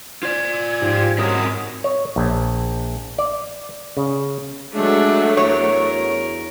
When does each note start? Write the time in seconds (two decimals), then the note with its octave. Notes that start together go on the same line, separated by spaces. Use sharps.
0.23 F4 C5 D5 G#6
0.81 G#2 F3 G4
1.18 F#2 C4 A#4 C#5 D#5 D#6
1.84 C#5
2.16 A#1
3.19 D5
3.97 C#3
4.73 F#3 G#3 A3 D4 E5
5.37 E2 A#4 C#5